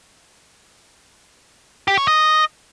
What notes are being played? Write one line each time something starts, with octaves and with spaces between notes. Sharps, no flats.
G4
C#5
D#5